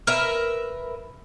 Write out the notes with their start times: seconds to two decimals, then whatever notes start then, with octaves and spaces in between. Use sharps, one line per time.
0.07 A#4 B4 E5